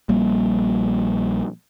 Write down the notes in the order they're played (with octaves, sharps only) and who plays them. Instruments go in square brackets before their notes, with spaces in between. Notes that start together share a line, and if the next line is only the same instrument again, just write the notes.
[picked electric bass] A#1 G3 A#3